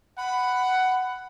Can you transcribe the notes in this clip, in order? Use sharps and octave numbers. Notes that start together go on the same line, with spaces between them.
F#5 B5